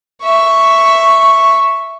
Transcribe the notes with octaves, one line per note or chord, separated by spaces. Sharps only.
E5 C#6